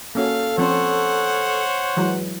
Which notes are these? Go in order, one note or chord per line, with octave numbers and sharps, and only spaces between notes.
A#3 C#4 F#4 A4 F5
F3 C4 C#4 C5 C#5 F#5
E3 F#3 G#3